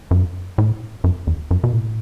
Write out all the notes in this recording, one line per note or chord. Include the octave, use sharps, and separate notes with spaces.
F#2
A2
F#2
E2
F#2
B2
A2